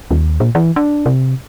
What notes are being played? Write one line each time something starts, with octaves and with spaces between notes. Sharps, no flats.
D#2
A#2
E3
D4
C3